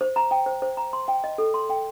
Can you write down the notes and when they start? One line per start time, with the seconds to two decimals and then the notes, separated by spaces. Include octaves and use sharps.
0.01 C5
0.16 A#5
0.31 G5
0.46 C5
0.62 C5
0.77 A#5
0.93 C6
1.08 G5
1.24 D#5
1.38 A4
1.54 C6
1.70 G5